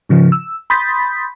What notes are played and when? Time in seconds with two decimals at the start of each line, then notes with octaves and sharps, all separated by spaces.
0.09 G#2 C#3 F3
0.32 E6
0.70 B5 C6 D#6 G6 A6 B6